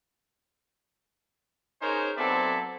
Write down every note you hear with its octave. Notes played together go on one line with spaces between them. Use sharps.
C#4 D#4 G#4 A#4 C5 C#5
F#3 B3 C4 A4 D5 E5